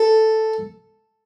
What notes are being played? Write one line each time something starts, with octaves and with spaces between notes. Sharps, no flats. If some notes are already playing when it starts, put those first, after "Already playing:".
Already playing: A4